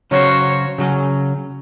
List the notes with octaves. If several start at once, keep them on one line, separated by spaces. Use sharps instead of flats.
C#3 F#3 C#4 F#4 C5 C#5
C#3 F#3 C#4